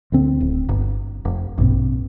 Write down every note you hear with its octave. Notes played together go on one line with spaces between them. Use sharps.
D2 D3 C4
D1
G1
F1
A#1 G2 B2 C4